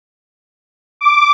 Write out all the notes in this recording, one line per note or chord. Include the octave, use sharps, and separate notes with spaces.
D6